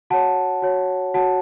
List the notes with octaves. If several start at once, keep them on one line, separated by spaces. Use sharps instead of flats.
F#4 C#5 F#5 A5
F#4 C#5
F#4 C#5 F#5 A5